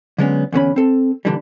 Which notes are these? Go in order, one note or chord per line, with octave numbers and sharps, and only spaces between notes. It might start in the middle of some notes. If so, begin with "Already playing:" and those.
D3 F#3 G#3 B3 C#4
E2 D3 C#4 B5
C4 A4
A#2 D3 E3 G3